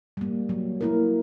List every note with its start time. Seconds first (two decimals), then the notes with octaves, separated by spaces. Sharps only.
0.17 G3 A#3
0.49 F#3
0.81 A#3 E4 A#4